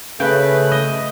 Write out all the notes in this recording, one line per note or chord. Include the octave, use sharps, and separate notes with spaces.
C#3 A3 B4 G5
D#5